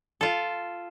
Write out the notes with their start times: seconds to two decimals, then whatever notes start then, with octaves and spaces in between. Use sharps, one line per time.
0.21 F4 A4